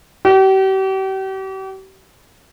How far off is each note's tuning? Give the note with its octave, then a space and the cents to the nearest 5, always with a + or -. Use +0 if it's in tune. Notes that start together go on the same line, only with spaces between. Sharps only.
G4 -40